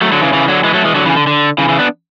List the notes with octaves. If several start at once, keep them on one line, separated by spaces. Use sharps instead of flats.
F#3 A3
D3 F#3
C#3 E3
C#3 E3
D3 F#3
E3 G#3
F#3 A3
E3 G#3
D3 F#3
C#3 E3
D3
D3
C#3 E3
C#3 E3
B3 D4